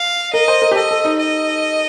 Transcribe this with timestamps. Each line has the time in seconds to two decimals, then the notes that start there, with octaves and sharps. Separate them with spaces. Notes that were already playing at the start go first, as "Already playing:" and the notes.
Already playing: F5
0.34 A#4 D#5
0.48 C5
0.62 A#4
0.71 G4
0.76 A4 D#5
0.91 A4
1.05 D#4
1.19 D#5